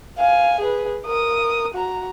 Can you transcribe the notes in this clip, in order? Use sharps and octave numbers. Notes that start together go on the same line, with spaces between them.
F5 G#5
G#4 B4
A#4 D#6
F#4 A#5